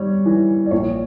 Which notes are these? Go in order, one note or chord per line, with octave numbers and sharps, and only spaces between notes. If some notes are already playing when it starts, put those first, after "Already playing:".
Already playing: G3 C#5
E3
D5
A#1 C#5